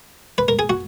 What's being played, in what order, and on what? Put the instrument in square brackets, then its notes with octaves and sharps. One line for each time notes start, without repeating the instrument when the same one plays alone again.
[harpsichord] B4
A#4
G#4
F#4